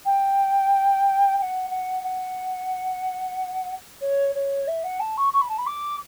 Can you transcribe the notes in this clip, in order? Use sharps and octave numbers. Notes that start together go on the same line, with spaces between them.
G5
G5
F#5
F#5
F#5
C#5
C#5
E5
F#5
A5
C#6
C#6
B5
A5
B5
D6